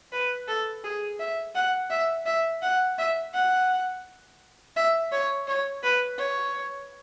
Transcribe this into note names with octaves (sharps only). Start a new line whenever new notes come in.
B4
A4
G#4
E5
F#5
E5
E5
F#5
E5
F#5
E5
C#5
C#5
B4
C#5